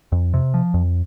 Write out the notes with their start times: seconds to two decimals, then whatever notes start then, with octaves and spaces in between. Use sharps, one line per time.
0.12 F2
0.34 C3
0.54 F3
0.74 F2